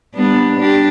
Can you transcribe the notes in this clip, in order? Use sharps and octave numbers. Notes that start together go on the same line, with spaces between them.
G3 B3 D4
D4 G4